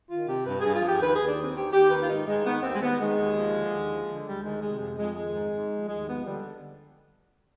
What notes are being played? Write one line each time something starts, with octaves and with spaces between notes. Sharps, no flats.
D#3 F4
C3 G4
G2 B4
G2 G#4
F4
F3 G4
G#4
D#2 B4
D#2 G#4
D4
D#3 C4
D#2 G4
D#2 G4
D#3 B4
F4
G#2 D#4
G#2 G#3
D#3 B3
D#2 C4
G#3
D#2 B3
D#3 G#3
D#2
F3
D3
D#2
F3
D3
D2 G3
D#3 G#3
C3 G#3
F2 G#3
F2 G#3
D#3 G#3
G#2
G#2
F3
D#2 G#3
F3 B3
D3 G3